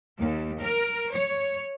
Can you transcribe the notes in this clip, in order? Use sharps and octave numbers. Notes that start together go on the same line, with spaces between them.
D#2
A#4
C#5